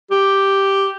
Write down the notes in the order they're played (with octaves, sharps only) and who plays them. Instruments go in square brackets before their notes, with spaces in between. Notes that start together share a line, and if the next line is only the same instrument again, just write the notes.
[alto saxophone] G4